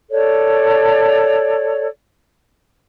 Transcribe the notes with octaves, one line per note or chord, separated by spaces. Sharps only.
A4 C#5 D5